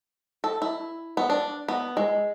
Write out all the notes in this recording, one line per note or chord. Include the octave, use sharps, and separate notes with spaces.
A4
E4
B3
D4
B3
G#3